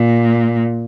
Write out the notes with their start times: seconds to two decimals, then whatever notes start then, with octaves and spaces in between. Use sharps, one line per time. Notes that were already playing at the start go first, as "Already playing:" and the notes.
Already playing: A#2